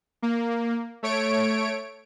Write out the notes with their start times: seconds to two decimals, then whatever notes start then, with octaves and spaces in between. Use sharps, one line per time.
0.22 A#3
1.03 A3 C#5 D7